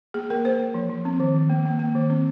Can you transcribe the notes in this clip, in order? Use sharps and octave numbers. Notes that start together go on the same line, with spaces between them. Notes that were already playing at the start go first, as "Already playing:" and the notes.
A#3 G#4
A#3 A#4
A#3 C5
A#3
F3
F3
C4
D#3
D#3
A#3
A#3
A#3
D#3
C4